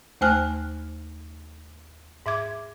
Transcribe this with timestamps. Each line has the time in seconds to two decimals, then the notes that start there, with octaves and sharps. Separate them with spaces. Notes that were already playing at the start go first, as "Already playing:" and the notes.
0.21 D#2 A3 C5 G#5 F6 F#6
2.26 G#2 E5 D6 G#6